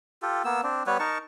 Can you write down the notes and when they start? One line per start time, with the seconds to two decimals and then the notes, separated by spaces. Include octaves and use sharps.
0.22 F4 G4 A4
0.44 A#3 B3 E6
0.63 C4 D4
0.87 G3 B3 B4 C#5
0.99 D#4 A#4 A5 C#6